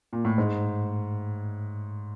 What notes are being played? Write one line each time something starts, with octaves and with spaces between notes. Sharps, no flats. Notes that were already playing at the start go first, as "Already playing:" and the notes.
A#2
A2
G#2